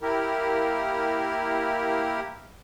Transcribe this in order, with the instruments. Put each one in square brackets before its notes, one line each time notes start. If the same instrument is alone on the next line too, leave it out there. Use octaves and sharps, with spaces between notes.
[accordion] A#3 E4 G4 A#4